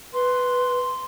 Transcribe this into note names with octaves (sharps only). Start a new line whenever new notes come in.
B4 C6